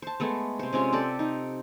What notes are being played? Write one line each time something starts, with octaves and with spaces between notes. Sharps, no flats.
C5 A5
G#3 A3 B3
C3 C5
C3 G#3 C#4 F4
G4 A4 C5 D5
D#4